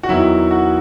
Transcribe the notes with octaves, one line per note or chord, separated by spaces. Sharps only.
F#4
E2 D#3 F#3 E4
F#4